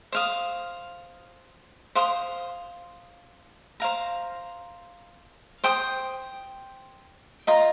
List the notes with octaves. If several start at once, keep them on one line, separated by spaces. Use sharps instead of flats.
C5 F5 D#6
C5 F5 C6 D#6
C5 F5 A#5
C5 G5 D#6
F4 D#5 A#5